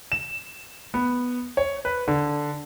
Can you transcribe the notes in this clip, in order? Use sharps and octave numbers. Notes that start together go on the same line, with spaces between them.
E7
B3
C#5
B4
D3